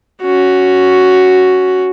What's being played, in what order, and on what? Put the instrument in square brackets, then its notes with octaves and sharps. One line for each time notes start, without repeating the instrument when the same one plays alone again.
[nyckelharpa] C#4 F#4